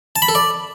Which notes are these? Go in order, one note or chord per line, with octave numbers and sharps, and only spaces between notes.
A5
B5
A4
D5